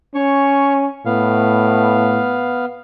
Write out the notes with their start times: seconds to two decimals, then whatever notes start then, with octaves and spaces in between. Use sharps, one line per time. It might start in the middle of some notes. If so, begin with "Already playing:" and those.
0.15 C#4 C#5 C#6
1.06 A2 B3 F5